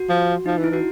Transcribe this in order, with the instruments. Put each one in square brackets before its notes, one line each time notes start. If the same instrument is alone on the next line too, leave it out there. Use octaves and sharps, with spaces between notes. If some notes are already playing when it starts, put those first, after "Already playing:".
Already playing: [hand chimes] F#4
[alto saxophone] F3
[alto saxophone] F3 [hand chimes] D#4
[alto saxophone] E3
[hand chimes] E4
[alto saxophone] E3 [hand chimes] F#4